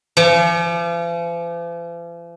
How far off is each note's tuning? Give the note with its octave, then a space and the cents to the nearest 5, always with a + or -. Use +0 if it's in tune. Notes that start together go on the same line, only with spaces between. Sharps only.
F3 -45